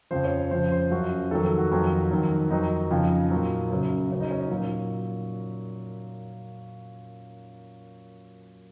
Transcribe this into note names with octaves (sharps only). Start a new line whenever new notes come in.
F2 C#3 F3 C5
C#5
C5
F2 C#3 F3 C5
C5
F#2 F3 F#4
F2 D#3 F#3 A4
A4
F#4
F2 D#3 F#3
F2 D#3 F#3
F2 D#3 F#3 D#4
F2 C#3 F3
A#2 F#3
F#2 C#3 F#3
F#2 C#3 F#3
D#4
C#4
D#4
A#2 F#3